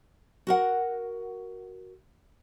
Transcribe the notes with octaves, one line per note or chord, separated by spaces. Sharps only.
F#4 A#4 F#5